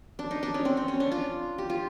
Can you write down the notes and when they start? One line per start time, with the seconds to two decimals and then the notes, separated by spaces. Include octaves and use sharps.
0.19 D4
0.31 D#4
0.43 D4
0.54 C#4
0.65 C4
0.77 C4
0.88 C#4
1.00 D4
1.12 F4
1.58 G4
1.70 F4